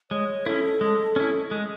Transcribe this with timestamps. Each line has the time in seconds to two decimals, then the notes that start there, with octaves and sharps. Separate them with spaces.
0.11 G#3 C#5
0.46 C#4 E4 A4
0.81 G#3
1.16 C#4 E4
1.51 G#3